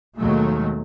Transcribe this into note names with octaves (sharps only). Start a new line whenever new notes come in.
D#2 B2 D#3 F#3 G#3 A3